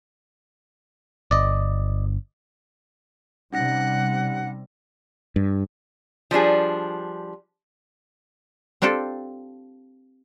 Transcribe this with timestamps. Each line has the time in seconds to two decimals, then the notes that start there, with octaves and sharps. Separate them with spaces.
1.31 G1 D5 D#5
3.52 C3 G3 C#4 D#4 F#5 A#6
5.36 G2
6.31 F3 G3 D4 G#4
8.82 C4 D4 F4 G4 A4